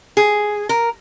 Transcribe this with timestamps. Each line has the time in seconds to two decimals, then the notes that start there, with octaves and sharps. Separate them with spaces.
0.17 G#4
0.69 A#4